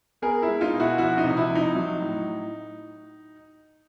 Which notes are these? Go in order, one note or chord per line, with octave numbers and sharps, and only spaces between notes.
B3 G#4 A#4
E4
G#3
D#4 F4
B2
E4 F#4
F3 E4 F#4
D#4
C3
E4
F3
D#4
F#3
A2